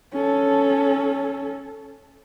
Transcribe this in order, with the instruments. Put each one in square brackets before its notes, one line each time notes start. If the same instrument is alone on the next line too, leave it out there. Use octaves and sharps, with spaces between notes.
[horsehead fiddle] C#4 A4